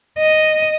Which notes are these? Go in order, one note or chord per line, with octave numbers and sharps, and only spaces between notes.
D#5